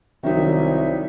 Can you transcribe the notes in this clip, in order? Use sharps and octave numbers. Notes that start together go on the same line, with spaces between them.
C2 D#3 F#3 D#4 E5